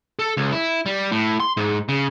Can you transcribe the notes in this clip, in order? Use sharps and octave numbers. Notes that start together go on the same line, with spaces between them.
A4
C#2
E4
G3
A2
C6
G#2
C#3